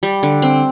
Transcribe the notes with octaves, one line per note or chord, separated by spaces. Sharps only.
G3
D3
C4